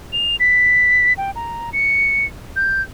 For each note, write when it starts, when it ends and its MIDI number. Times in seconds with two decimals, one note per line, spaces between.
0.13 0.36 101
0.40 1.13 95
1.18 1.31 79
1.36 1.70 82
1.73 2.26 97
2.56 2.82 91